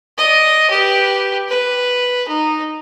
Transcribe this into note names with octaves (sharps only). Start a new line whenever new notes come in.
D5 D#5
G4 B4
B4
D#4